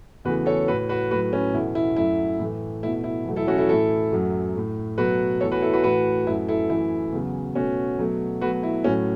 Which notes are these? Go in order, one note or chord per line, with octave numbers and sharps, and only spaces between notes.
E2 C#3 E3 A3 F#4 B4
A4 C#5
A2 A3 F#4 B4
F#4 B4
A2 F#3 A3 F#4 B4
C#4
E2 B2 A3 E4
E4
F#2 F#3 A3 E4
A2 E3 A3
B2 A3 E4
E4
E2 B2 F#3 A3
E4 A4
C#4 F#4
E4 A4
A2 E3 A3 E4 A4
F#2 F#3 A3
A2 A3
B2 F#3 A3 F#4 B4
E2 E3 A3 A4 C#5
F#4 B4
E4 A4
F#4 B4
A2 E3 A3 F#4 B4
F#2 F#3 A3 E4
E4 A4
F#2 E3 A3 E4
E2 C#3 F#3
B2 A3 C#4 F#4
B2 F#3 A3
B2 F#3 A3 F#4 B4
E4
A2 F#3 A3 C#4 F#4